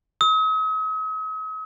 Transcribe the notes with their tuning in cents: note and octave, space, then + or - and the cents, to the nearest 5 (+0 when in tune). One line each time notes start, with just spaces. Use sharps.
D#6 +45